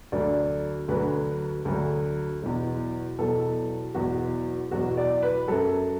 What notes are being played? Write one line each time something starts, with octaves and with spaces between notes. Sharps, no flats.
D2 D3 F#3 D5
D2 D3 F#3 B4
D2 D3 F#3
E2 B2 F#3
E2 B2 F#3 A4
E2 B2 F#3 F#4
E2 B2 F#3 F#4
D5
B4
F#2 F#3 A4